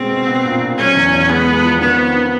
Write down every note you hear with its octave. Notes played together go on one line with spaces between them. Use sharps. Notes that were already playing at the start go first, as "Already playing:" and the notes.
Already playing: B2 G#3 C4
B2
B3
A#2
A#2
F#3 C#4
E2
E2
G#3 B3
G#3
F3
D#3 B3
C4
D#3